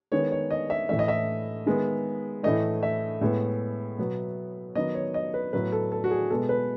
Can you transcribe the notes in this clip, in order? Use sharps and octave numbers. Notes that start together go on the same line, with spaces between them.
D#3 G#3 B3 C#5
C#5
D#5
E5
A2 E3 A3 E5
D#5
E5
D#3 G#3 B3
A2 E3 A3 D#5
E5
A2 G#3 B3
B2 F#3 B3
D#3 F#3 B3 D#5
C#5
D#5
B4
A2 F#3 B3 B4
A4
A4
F#4
G#4
B2 G#3 B3 A4
B4